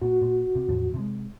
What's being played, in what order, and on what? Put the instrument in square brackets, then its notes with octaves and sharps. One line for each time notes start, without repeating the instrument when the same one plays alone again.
[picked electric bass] A#2 [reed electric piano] F#4
[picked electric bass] A#2
C3
E2 A2 F3
C3 F3 G#3